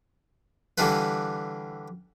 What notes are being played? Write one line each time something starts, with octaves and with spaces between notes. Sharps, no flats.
D3 E3 G3 D4 F4 B4